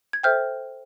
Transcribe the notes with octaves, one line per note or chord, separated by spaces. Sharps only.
G#6
A4 C5 E5 G5 F6 G6